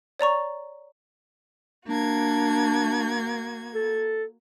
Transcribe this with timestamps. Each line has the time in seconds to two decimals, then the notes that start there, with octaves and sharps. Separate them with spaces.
0.19 C#5 D5 A#5 C#6
1.88 A#3 D4 F#4 G#6
3.75 A4